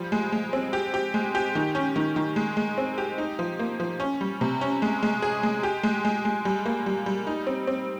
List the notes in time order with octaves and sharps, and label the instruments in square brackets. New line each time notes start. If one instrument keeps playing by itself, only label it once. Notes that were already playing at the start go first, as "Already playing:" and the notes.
Already playing: [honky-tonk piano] F3 G3
G#3
G#3
C4
G4
G4
G#3
G4
D#3
C#4
D#3
D#3
G#3
G#3
C4
G4
D#4
F3
A#3
F3
C#4
G3
C3
C#4
G#3
G#3
G#4
G#3
G4
G#3
G#3
G#3
G3
A#3
G3
G3
D#4
C4
C4